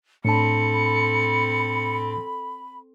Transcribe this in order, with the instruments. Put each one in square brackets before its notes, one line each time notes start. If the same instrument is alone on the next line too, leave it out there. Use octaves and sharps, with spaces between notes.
[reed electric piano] A2 D4 A5 [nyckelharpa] C4 A4 [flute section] B5 [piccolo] C#7